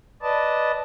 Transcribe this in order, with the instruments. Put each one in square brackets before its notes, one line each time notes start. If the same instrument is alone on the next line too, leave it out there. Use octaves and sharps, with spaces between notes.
[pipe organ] B4 D5 D#5 A5